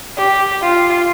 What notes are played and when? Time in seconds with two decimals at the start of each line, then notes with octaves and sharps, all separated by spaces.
0.18 G4
0.62 F4